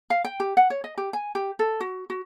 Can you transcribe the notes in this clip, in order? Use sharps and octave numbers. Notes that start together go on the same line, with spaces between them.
F5
G5
G4
F#5
C#5
D#5
G4
G#5
G4
A4
F#4
F#4